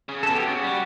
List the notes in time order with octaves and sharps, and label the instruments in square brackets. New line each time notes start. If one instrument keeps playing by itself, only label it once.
[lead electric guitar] C#3
[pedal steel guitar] A4
[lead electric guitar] B2
[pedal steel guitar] G4
[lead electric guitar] C#3 [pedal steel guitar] F#4
[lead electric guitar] G3